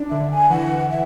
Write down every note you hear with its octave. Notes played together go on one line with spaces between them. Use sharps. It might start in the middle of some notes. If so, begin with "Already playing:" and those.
Already playing: D4
D3 E5
G#5
E3 F#5
E5